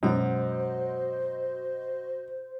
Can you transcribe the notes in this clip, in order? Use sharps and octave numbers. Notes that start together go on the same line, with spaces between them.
F#2 B2 F#3 G#3 F#4 C5 D#5